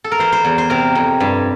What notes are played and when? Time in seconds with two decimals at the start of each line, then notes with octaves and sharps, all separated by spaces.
0.04 A4
0.12 A#4
0.19 E3 C5
0.32 C5
0.44 E2
0.58 C5
0.70 C3 A#4
0.95 F2
1.20 G2